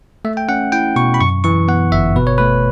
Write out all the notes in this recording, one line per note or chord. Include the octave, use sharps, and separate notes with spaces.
A3 E5
G5
C#4 F#5
E4 G5
B2 C#6
B5
F#2 C#6
E3 C#6
B3 F#5
G1 E5
B2 B4
C#5
A3 B4